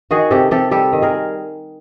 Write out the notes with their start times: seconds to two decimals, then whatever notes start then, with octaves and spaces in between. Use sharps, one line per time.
0.11 D#3 F#4 G#4
0.31 C3 G4 A4
0.51 C3 G4 A4
0.71 G3 G4 A4
0.93 D#3
1.02 G#4 A#4